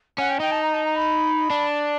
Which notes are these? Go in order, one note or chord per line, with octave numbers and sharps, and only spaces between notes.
C#4 F#5
G5
D#4 G5
A5
A#5
A5
A#5
B5
D4